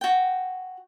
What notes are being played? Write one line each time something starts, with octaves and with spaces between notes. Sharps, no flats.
F#4 G5